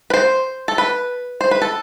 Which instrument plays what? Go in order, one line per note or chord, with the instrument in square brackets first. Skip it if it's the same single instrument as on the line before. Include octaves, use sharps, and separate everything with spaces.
[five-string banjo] B4
C5
A4
B4
C5
B4
A4